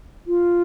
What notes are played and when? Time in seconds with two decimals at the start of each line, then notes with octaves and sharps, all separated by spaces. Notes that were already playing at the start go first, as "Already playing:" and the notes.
0.27 F4